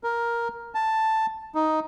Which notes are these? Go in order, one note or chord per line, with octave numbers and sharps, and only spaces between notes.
A#4
A5
D#4